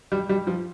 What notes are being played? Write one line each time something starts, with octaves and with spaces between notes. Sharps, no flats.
G3
G3
F3